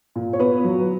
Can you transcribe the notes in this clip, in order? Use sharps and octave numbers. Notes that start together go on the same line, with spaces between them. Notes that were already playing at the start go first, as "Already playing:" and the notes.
A#2
C#5
B3 B4
F#3